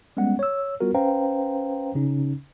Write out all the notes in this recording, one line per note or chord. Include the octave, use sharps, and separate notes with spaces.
G3 G#3 B3 C#4 F#5
C#5 E6
G3 B3 F4 F#4 A#4
C#4 B4 C5 F5 G5 A#5
C#3 C#4 D#4